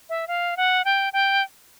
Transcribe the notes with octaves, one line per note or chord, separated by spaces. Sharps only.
E5
F5
F#5
G5
G5